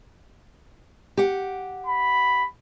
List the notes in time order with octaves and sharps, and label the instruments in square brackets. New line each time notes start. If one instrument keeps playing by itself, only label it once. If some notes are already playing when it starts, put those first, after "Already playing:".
[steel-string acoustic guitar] G4 F#5
[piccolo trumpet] B5